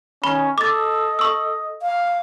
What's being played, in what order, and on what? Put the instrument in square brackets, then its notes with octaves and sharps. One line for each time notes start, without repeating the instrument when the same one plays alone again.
[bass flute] D#3 [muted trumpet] C#4 [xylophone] B5 G7
[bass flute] A4 [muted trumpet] D#5 [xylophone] D6 A6
[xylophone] C#6 E6
[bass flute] F5